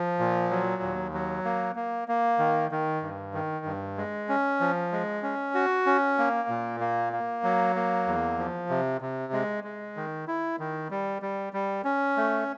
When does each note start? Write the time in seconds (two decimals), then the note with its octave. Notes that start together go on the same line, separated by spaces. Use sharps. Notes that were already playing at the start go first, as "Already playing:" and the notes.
Already playing: F3
0.19 A#2
0.50 F#3
0.82 D#2
1.14 F#3
1.45 A#3
1.76 A#3
2.08 A#3
2.39 D#3
2.71 D#3
3.02 G2
3.34 D#3
3.65 G2
3.97 G#3
4.29 C#4
4.60 F3
4.92 G#3
5.23 C#4
5.55 F#4
5.86 C#4
6.18 A#3
6.49 A#2
6.80 A#3
7.13 A#3
7.43 F#3
7.76 A#3
8.07 E2
8.39 F3
8.69 C3
9.01 C3
9.33 G#3
9.64 G#3
9.96 D#3
10.28 E4
10.59 D#3
10.91 G3
11.22 G3
11.53 G3
11.85 C#4
12.17 A3